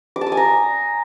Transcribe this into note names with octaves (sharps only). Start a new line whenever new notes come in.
D6
A5
D#6
G#5
A#5